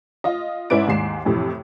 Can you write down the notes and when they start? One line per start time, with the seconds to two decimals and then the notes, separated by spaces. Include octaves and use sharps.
0.24 F4 D#5
0.70 G#2 C#4 E4 B4 D5 D7
0.88 D#2 G#2 C7 E7
1.25 F2 A2 C3 E3